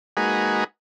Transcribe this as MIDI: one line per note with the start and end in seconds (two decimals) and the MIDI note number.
0.17 0.64 56
0.17 0.64 58
0.17 0.64 63
0.17 0.64 66
0.17 0.64 68
0.17 0.64 71